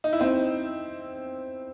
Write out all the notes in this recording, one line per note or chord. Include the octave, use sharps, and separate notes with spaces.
D#4
E4
C4 D#4